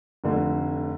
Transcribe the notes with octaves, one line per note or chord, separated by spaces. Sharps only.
F1 F2 D3 A3